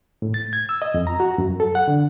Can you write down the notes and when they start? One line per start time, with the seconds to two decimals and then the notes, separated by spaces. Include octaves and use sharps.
0.22 A2
0.34 A6
0.53 G#6
0.69 E6
0.82 D#5
0.94 F2
1.07 A#5
1.20 F#4
1.38 F#2
1.60 A4
1.75 F#5
1.88 D3